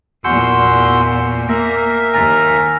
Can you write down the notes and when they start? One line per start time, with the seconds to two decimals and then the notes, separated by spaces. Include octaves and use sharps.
0.24 E2 A#2 F#4 G#5 C6 E6 G6 C#7
1.49 A#3 A#4 E5 A#6 B6
2.14 D#2 G#5 A#5 F6 A6